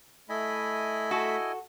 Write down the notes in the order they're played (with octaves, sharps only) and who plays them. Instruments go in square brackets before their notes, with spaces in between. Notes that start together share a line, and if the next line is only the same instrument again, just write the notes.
[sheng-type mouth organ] A3 B5 [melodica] E4 D#5 G#5
[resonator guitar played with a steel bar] F#4 A4